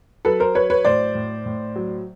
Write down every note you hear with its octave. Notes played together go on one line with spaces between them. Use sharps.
F#3 A4 B4
A#4 C5
F#3 B4 C#5
B4 C#5
A2 C5 D5
A2
A2
F#3